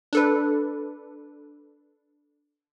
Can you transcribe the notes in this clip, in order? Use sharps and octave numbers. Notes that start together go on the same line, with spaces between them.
D4 A4 B4